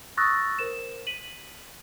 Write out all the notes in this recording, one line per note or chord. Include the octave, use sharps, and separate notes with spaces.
C#6 D#6 E6 F#6 A6 A#6
A#4 C5 E7
B6 D#7 F#7